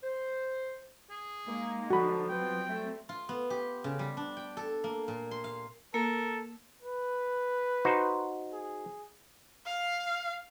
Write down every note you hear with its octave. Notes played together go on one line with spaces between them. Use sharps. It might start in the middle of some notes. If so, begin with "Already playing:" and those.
C5
G#4
G#3 A#3 D#4
D3 F3 F#4 B5
F#3 G3 B3 C4 F4 G5
A3
F4
B3
G4
C#3
G3
D4
G5
A4
A#3
A#2
C6
F5
A#3 A4 A#4
B4
D#4 F#4 C5
G#4
F5